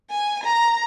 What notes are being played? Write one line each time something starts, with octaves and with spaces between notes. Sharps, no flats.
G#5
A#5